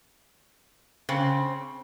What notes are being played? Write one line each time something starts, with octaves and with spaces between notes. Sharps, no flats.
C#3 C4